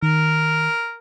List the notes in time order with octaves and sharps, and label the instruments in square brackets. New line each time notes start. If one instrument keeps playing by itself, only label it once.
[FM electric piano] D#3 [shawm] A#4